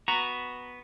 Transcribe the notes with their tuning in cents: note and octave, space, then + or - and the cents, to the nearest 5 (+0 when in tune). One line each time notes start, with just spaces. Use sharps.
B3 +0 F#4 +0 A#5 -5